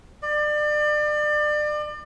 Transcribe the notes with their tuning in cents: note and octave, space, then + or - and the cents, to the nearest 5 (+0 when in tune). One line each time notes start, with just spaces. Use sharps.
D5 +30